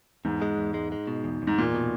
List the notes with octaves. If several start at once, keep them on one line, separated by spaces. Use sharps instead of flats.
E2 G#2
G#3
E2
G#3
G#3
B2
E2
E2
G#2
E2 A#2
B2